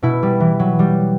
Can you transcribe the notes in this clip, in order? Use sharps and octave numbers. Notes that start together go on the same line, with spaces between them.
B2 E4
G3
E3
F#3
G3